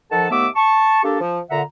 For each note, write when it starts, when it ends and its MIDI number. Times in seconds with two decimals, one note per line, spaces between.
0.11 0.27 51
0.11 0.27 53
0.11 0.27 69
0.11 0.27 78
0.11 0.27 81
0.30 0.46 39
0.30 0.46 57
0.30 0.46 59
0.30 0.46 76
0.30 0.46 86
0.30 0.46 88
0.55 1.01 81
0.55 1.01 85
1.04 1.18 58
1.04 1.18 62
1.04 1.18 67
1.04 1.18 69
1.21 1.40 53
1.50 1.62 46
1.50 1.62 50
1.50 1.62 76
1.50 1.62 78
1.50 1.62 82